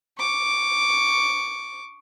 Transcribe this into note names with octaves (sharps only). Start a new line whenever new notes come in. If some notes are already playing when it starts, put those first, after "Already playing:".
C#6 D6